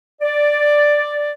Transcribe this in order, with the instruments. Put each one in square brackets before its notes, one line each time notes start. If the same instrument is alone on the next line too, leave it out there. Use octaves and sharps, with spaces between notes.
[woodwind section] D5